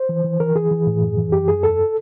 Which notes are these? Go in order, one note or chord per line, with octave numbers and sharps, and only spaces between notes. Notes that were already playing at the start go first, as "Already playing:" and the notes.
Already playing: C5
E3
E3
E3 A#4
E3 G#4
E3
A2
F#2
E3
F#2 G4
F#2 G#4
E2 A4